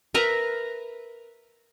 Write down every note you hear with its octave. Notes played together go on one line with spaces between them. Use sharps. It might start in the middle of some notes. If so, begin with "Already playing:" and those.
A#4 B4 E5 A#5